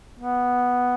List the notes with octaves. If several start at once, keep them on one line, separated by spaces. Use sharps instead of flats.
B3